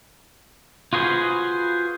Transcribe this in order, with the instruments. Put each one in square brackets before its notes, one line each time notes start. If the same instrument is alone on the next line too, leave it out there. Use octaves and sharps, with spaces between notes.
[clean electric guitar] F4 F#4 G#4 B4 C5